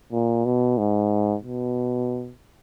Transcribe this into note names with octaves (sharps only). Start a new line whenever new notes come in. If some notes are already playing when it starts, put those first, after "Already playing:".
A#2
B2
G#2
B2